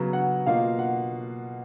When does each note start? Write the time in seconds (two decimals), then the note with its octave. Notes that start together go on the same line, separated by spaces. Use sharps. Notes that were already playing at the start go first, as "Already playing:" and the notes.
Already playing: C#3 F#3 B3 A#5
0.13 F#5
0.46 B2 A#3 F4 F5
0.79 F#5